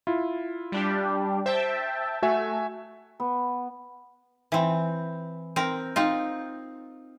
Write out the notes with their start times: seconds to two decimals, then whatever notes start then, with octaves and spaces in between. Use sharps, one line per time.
0.07 E4 F4
0.72 G3 D4 G4
1.46 C5 E5 G5 A5
2.22 A3 F#4 E5 G#5
3.20 B3
4.52 E3 C4
5.56 C4 A#4
5.96 C4 D#4 F4